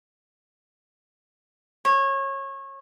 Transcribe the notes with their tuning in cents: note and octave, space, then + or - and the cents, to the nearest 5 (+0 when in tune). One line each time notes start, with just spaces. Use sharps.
C#5 -25